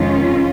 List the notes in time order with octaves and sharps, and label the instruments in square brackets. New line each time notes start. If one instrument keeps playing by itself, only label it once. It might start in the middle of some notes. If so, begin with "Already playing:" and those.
Already playing: [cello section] F2 C3 D#3 G#3 C#4 F4